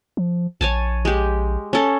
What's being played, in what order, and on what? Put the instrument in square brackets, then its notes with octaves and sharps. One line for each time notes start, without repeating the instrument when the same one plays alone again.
[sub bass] F3
[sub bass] A#1 [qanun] C#5 G#5 A5
[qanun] G#3 G4
C#4 A4